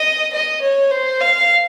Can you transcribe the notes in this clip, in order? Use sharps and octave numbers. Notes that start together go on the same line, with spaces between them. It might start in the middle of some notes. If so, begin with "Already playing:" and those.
Already playing: D#5
D#5
C#5
C5
F5